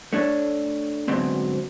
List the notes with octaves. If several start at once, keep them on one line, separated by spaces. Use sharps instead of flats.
A3 D4 C#5
D2 G#2 B2 F#3 B3 C4